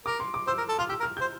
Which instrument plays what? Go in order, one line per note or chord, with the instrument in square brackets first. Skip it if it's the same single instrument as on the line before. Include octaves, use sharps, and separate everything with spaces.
[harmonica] A#4 [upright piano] D6
[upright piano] C6
D6
[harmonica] C5 [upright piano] E6
[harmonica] A#4
A4
[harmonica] F4 [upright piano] F6
[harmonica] G4 [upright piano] E6
[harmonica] A#4
[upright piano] F6
[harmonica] C5 [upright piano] G6